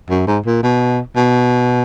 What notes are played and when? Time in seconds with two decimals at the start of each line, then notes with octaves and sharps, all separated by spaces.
0.09 F#2
0.27 G#2
0.45 A#2
0.63 B2
1.16 B2